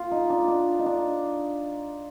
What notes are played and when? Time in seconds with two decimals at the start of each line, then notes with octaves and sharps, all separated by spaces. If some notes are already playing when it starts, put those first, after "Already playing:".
Already playing: F4
0.11 D#4
0.30 D4
0.48 D4
0.79 D#4
0.86 D4